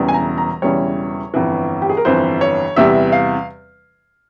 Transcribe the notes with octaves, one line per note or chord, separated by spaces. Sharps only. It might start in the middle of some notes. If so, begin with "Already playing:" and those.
Already playing: E1 E2 C#3 E3 G3
G#5
A#5
A#5
E1 E2 C#3 E3 G3 C#5
G1 F2 E3
G4
G#4
A#4
G1 F2 E3 C5
C#5
E2 C3 E3 G3 E5
F5